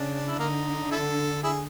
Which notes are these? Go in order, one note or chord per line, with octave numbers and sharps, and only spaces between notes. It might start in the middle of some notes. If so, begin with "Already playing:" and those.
Already playing: C#3 D4
E4
D3 A#3 D#4
E4 A4
E4 G#4